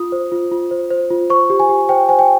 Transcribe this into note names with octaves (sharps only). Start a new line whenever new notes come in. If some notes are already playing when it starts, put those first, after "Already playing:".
Already playing: F4 D#6
C5
F4
F4
C5
C5
F4
C5 C#6
G4
G#5
G4
C5 G5
C5 G#5
G5